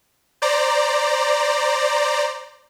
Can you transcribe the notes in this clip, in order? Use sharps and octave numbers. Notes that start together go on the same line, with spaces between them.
C5 D5 A#5